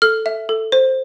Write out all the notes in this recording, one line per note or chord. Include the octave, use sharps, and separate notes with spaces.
A4 F6
E5
A4
C5